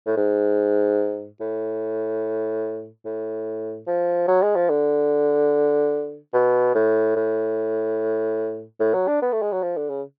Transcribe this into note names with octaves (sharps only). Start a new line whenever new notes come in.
A2
G#2
A2
A2
F3
F#3
G#3
F3
D3
B2
A2
A2
A2
F#3
D4
B3
A3
G#3
F#3
F3
D3
C#3